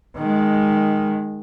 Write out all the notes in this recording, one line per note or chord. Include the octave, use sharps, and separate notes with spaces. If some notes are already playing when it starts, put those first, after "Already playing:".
D#3 G#3